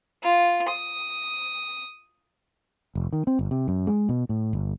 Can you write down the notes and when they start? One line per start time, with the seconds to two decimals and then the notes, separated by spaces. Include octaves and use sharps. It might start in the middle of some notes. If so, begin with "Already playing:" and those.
0.23 F4
0.69 D#6
2.95 F1
3.13 D#3
3.27 C4
3.39 G1
3.51 C3
3.68 F#2
3.87 G#3
4.09 B2
4.29 A2
4.53 G1